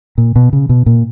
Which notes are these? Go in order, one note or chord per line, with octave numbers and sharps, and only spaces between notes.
A#2
B2
C#3
B2
A#2